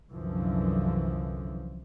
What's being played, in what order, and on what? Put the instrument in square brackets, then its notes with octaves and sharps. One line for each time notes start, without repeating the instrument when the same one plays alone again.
[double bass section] C2 F#2 D3 E3 F3